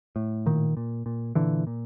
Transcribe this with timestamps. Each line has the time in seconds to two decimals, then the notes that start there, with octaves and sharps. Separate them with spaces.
0.16 A2
0.46 A#2 D#3
0.77 A#2
1.06 A#2
1.35 A#2 D3 E3
1.67 A#2